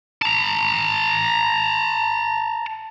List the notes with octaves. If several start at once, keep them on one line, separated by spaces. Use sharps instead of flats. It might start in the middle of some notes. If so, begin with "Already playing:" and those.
A5 A#5